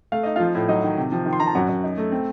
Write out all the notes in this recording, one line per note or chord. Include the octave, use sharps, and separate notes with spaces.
A3 F5
D#4 D#5
F3 F4 F5
A2
F#3 D#4 D#5
D#3
C3
F3
D#3
C6
D#3 A#5
A5
F#2 F#4 F#5
F#2
D#4
A3
C4